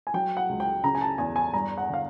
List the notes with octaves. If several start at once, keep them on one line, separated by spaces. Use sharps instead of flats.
G#5
F#3 G5
F#5
C#2
G5
C#3 A#5
G#5
A5
E2 G#5
G#5
G2 A#5
F#5
D3 F5